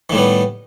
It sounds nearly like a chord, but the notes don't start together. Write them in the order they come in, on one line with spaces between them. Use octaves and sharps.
D#3 A2 G3 B3